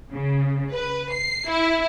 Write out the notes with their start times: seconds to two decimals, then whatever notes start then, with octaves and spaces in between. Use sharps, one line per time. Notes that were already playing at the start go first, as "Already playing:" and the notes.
0.11 C#3
0.72 B4
1.12 C7
1.49 E4